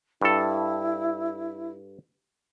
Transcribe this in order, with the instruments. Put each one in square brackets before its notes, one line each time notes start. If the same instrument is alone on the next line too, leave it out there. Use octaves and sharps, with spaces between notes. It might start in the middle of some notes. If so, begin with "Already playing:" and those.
[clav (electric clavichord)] G2 A4 [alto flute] E4